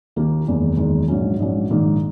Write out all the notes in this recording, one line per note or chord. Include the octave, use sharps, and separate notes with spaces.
D#2 D#3 A#3 D#4
F#1 E2 D#3 G#3
F#1 E2 D#3 G#3
A#1 G#2 F#3 C#4
A#1 G#2 F#3 C#4
A#1 G#2 D#3 A#3